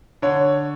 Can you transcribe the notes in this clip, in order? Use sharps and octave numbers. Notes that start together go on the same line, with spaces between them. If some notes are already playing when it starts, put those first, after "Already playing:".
D3 C#5